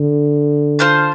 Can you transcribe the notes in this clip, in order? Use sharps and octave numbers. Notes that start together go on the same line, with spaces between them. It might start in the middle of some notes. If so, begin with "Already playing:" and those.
Already playing: D3
F4 C5 F5 A5